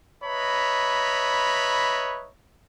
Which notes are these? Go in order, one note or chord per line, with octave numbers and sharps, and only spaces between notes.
B4 C#5 D#5 E5 A#5 B5